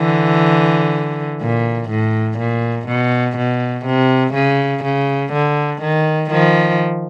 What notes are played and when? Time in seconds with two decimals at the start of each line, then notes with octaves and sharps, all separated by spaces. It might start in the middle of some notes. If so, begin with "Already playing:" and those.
Already playing: D3 E3
1.41 A#2
1.90 A2
2.38 A#2
2.87 B2
3.37 B2
3.86 C3
4.34 C#3
4.84 C#3
5.33 D3
5.82 D#3
6.31 D#3 F3